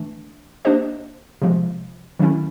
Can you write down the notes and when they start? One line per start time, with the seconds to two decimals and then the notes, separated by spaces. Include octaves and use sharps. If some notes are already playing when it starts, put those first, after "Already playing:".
Already playing: E3 A3 D4
0.65 A#3 D4 G4 C5 D#5
1.42 C3 F3 G#3
2.19 D#3 F#3 A3 C#4 E4